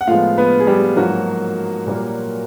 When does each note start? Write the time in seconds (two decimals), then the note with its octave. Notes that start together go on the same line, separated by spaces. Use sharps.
0.01 F#5
0.07 A2 F3 G#3 B3 F4 F5
0.38 B3 B4
0.60 G#4
0.67 G3 G4
0.97 G#2 F3 F#3 A#3 F#4
1.86 A#2 G3 A#3